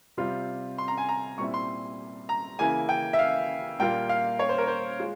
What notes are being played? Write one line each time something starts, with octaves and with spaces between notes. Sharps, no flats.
C3 G3 C4 F4
C6
A#5
G#5
A#5
A#2 G3 C4 E4 C#6
C6
A#5
C#3 E3 A#3 E4 G#5
G5
E5
F5
A#2 G3 A#3 F4 G5
F5
C#5
C5
A#4
C5
G#3 F4